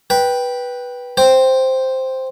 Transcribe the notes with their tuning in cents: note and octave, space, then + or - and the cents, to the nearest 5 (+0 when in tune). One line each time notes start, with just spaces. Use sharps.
B4 -10 G5 +0
C5 +0 G5 +0